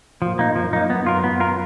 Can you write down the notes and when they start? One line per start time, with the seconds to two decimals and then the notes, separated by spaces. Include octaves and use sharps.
0.22 A#2 F3
0.39 A#3 D#4
0.56 F#2 F3
0.73 A#3 D#4
0.90 B3
1.06 F4 A#4
1.23 F#2 B3
1.40 F4 A#4